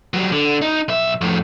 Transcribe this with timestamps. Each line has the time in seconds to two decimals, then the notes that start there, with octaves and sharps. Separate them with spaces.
0.14 F#3 G3
0.32 D3
0.62 D#4
0.88 B1 E5
1.21 F2 A2